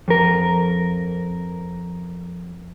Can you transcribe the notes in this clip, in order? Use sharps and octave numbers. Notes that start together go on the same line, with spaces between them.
F2 A#4